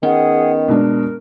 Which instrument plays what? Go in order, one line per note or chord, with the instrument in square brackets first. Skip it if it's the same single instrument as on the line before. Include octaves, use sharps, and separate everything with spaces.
[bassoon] D#3 [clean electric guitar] B3 C#4 G5 [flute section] G#4 F#5
[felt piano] B2 G#3 D4 [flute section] A#4